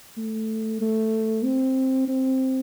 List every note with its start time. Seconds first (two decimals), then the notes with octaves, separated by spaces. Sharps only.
0.17 A3
0.81 A3
1.44 C4
2.08 C4